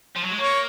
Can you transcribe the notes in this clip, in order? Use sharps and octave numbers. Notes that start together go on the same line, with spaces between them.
F3
F#3
G#3
A#3 C#5